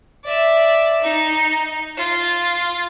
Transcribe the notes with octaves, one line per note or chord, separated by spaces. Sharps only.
D5 E5
D#4
F4